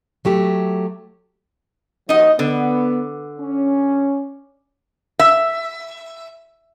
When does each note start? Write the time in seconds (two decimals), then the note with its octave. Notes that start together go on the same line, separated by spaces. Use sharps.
0.25 F#3 A3 G4
2.09 D#2 F3 D#4 F#4 D#5
2.39 D3 B3
3.40 C#4
5.19 E5